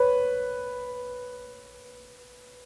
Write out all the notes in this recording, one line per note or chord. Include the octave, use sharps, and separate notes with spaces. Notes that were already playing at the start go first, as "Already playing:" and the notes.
Already playing: B4 C#5